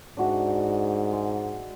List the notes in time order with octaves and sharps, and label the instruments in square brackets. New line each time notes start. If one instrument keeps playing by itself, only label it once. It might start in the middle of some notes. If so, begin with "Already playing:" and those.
[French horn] G#2 [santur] D4 F#4 E5
[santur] G#3